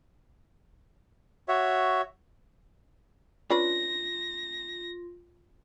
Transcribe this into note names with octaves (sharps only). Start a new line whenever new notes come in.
F#4 C#5 E5
C#4 D4 F4 B4 A#6